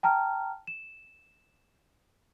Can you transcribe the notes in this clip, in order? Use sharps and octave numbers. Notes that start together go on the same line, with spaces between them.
G5 A5 A#5 F6
E7